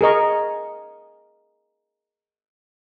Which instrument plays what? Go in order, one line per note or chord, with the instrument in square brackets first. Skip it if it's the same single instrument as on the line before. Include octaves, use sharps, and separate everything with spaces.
[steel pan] G#4 A#4 D#5 C#6